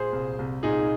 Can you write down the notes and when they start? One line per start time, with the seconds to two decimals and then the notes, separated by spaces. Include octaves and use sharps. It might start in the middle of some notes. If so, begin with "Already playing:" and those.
Already playing: A#2 G#4 C5
0.13 C2
0.38 C2
0.63 A#2 D#4 G#4